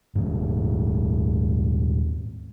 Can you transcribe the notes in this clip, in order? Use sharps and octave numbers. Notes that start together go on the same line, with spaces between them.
D#1 G#2